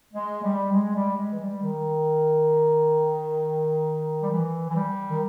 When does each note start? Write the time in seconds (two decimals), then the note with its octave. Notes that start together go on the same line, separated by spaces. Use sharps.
0.13 G#3
0.43 G3
0.73 G#3
0.95 G3
1.17 G#3
1.32 E3
1.40 G3
1.62 D#3
4.23 G3
4.31 E3
4.70 E3
4.76 G3
5.10 D#3